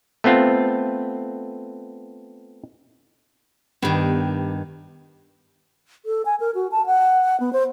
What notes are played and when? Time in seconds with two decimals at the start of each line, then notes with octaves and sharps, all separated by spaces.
0.24 A3 B3 C4 F4
3.82 G2 D#3 B3 G4
6.06 A4
6.26 G#5
6.40 A#4
6.55 F#4
6.72 A5
6.86 F#5
7.40 B3
7.53 C5